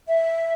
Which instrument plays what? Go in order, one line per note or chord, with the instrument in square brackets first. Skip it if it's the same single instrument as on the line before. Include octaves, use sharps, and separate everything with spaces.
[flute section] E5